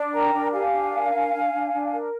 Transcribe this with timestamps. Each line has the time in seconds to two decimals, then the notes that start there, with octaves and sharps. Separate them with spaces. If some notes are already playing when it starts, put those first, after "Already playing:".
Already playing: D4
0.13 A#4 G5 A#5
0.33 D4
0.52 G4 F5 G#5
0.73 D4
0.92 A#4
1.13 D4
1.33 D4
1.53 D4
1.73 D4
1.93 A#4